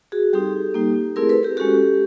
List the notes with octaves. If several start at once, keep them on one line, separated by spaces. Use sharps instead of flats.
F#4 G#4
G3 C4 D#4 G4 A4
G3 A#3 D#4
A3 C4 E4 G#4 A#4
A4 B4
G4 A4
G#3 C#4 F#4 G4 A4